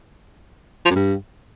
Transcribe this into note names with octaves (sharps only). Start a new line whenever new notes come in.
F3
F#2
G2